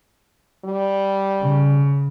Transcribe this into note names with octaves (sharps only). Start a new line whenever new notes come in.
G3
C#3